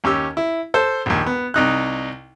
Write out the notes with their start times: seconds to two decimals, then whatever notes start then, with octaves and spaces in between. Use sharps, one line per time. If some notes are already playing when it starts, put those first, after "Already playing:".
0.04 D#2 C#4 G4 E6
0.37 E4
0.74 A4 C5
1.06 A#1 D#2
1.26 B3
1.54 C2 D#4 F#6